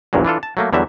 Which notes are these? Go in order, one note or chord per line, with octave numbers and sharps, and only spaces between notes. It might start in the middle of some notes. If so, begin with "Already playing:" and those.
A#1 E2 G2 A#2 F#3
E3 D4 F4 A4
A5
F#3 A3 A#3
E2 D3 F#3 G3 E5